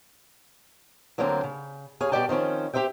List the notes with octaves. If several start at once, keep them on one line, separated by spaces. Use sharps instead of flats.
D2 D3 F#3 A#3 C4 A5
C#3
D#2 G#4 C#5 F5 G#5
B2 G3 G4 D5 G5 A5
D#3 F3 C4 C#4
G4 G#4 C5 E5 G5